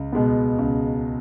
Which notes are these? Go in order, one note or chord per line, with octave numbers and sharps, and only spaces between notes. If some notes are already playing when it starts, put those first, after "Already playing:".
Already playing: C#2
B2 G#3 B3
C#2